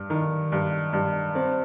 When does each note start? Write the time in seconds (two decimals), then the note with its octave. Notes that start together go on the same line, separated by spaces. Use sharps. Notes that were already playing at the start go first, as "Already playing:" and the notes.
Already playing: G2
0.10 D#3
0.52 G2
0.93 G2
1.35 C4